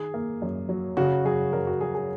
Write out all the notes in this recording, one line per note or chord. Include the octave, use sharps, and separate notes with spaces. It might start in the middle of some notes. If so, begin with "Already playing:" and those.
Already playing: D#3 G#4
A#3
F#2
F#3
C#3 F#4
F#2 G#4
F#2 A#4
F#4
F#3 G#4
G#4